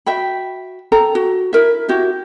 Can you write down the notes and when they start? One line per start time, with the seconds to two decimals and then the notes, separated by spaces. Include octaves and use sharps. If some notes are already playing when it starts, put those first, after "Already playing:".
0.06 F#4 E5 G5 B5
0.92 A4 G5 A5 A#5
1.15 F#4
1.53 E4 A#4 E5
1.89 E4 F#4 G4 E5